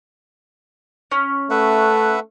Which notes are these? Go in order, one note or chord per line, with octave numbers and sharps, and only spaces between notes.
C#4
A3 B4 E5 F#5